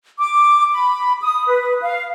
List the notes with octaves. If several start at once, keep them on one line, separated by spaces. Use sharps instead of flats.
D6
B5
D#6
B4
F5